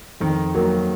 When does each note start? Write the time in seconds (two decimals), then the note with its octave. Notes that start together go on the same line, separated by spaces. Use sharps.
0.21 F2 D#3
0.55 F#3 A#3